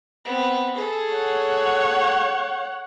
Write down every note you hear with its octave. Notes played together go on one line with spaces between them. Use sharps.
B3 C4
G#4 A4
C#5 F#5